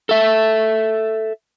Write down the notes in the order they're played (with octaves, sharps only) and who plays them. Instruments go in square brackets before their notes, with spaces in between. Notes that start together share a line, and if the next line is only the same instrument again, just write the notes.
[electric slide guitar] A4 E5